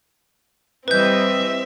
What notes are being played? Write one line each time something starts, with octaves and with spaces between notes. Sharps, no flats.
E3 G3 C4 B4 D#5 E5 G6